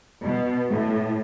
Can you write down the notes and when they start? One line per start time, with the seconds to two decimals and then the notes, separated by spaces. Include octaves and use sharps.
0.23 B2
0.70 A2